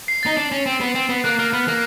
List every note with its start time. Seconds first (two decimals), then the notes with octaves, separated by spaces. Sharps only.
0.08 C7
0.23 D#4 A6
0.37 D4
0.52 C#4
0.66 C4
0.81 B3
0.95 C4
1.09 B3
1.24 A#3 F#6
1.39 A#3 F6
1.53 B3 F6
1.68 A#3